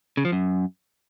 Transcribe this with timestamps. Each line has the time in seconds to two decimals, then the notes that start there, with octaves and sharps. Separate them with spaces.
0.17 C#3
0.25 F3
0.32 F#2